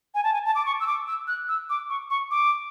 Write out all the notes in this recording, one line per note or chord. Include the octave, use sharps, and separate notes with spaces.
G#5
A5
G#5
A5
D6
C#6
E6
D6
E6
F#6
E6
D6
C#6
C#6
D6